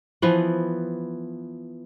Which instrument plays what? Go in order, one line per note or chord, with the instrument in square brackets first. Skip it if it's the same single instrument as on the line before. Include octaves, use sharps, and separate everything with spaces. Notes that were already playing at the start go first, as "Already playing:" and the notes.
[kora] E3 F3 B3